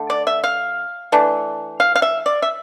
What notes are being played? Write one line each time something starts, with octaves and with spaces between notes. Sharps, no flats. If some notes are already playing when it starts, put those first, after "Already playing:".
Already playing: D3 A3 D4
D5
E5
F5
E3 A3 D4
F5
F5
E5
D5
E5